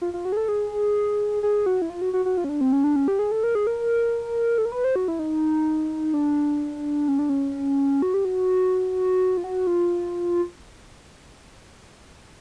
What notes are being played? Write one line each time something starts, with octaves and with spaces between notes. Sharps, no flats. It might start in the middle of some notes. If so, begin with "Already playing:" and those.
F4
F4
F#4
G#4
A4
G#4
G#4
F#4
E4
F4
F#4
F#4
F#4
F4
C#4
D4
C4
C#4
D4
C#4
G4
G#4
A4
A#4
G#4
A#4
A4
A#4
B4
C5
F#4
E4
D#4
D4
C#4
D4
C#4
F#4
G4
F#4
F4
F#4
F4